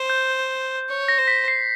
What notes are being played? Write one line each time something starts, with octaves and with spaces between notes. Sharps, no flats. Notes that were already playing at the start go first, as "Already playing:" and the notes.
Already playing: C5
G6
C#5
A#6
C5
B6
C7